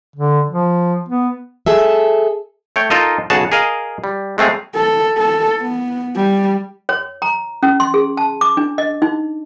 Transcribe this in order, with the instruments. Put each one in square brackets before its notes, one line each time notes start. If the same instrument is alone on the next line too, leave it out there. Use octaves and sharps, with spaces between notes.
[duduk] D3
F3
B3
[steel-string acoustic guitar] G#4 A4 E5
[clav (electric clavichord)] A3 C#5 G5
D#4 F4 A4 A#4 D#5
B1 C#3 F#4 G#4 C#5 A5
G#4 A#4 D#5 F5
G3
G#3 A3 C4 G#4 F5
[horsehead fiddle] A4
A4
B3
G3
[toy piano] C#5
A#5
C#4
C6
G#4
A5
D6
D4
D#5
D#4